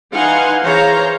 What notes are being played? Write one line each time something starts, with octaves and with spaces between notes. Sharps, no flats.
E3 D#4 F5 F#5 G#5 C6
E3 G#4 C5 C#5 F5 A#5